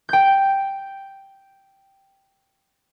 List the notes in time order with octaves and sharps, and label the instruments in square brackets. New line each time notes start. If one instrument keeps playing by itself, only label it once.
[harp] G5 G6